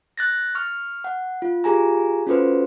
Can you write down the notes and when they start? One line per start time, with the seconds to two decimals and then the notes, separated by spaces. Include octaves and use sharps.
0.18 F#6 A6 A#6
0.55 C#6 F6
1.04 F#5
1.42 F4
1.64 F4 G4 G#4 G#5 A#5
2.27 C#4 F4 F#4 A4 B4 C5